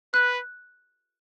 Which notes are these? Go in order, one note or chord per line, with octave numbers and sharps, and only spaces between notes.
B4 F#6